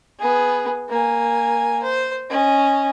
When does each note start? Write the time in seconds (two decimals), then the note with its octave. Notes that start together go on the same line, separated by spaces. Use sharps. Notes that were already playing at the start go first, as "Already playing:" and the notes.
0.20 B3 G#4
0.89 A#3 G#5
1.83 C5
2.30 C#4 D#5